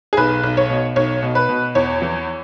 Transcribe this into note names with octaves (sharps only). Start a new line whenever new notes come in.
G#4
B1 B4
B1
C#5
B2
B1 C#5
B2
B4
B2
E2 C#5
E3